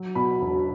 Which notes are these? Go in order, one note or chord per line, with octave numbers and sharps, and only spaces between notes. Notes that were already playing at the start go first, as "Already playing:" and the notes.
Already playing: F#3
B2 B5
E1